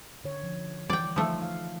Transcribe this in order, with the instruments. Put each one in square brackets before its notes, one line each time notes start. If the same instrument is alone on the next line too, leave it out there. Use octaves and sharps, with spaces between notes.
[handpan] D3 C#5
F3
[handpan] E3 [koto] D5 G5
[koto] F3 A3 [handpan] D#4
[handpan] F5